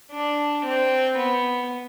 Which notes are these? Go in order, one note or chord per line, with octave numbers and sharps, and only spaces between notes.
D4
C4
B3